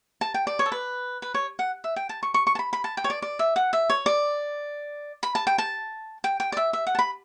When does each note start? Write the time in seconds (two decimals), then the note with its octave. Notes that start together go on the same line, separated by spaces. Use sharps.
0.21 A5
0.34 G5
0.47 D5
0.59 C#5
0.66 A4
0.72 B4
1.22 B4
1.34 C#5
1.59 F#5
1.84 E5
1.96 G5
2.09 A5
2.23 C#6
2.34 C#6
2.47 C#6
2.55 A5
2.59 B5
2.73 B5
2.84 A5
2.97 G5
3.04 C#5
3.10 D5
3.22 D5
3.39 E5
3.56 F#5
3.73 E5
3.90 C#5
4.06 D5
5.23 B5
5.35 A5
5.47 G5
5.58 A5
6.24 G5
6.40 G5
6.52 D5
6.57 E5
6.73 E5
6.87 F#5
6.95 A5
6.99 B5